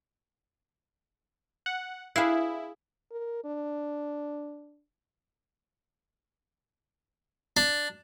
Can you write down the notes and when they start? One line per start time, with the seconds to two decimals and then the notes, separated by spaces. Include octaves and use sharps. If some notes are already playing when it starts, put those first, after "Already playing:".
1.66 F#5
2.16 E4 G#4 B4 F5
3.11 A#4
3.45 D4
7.57 D4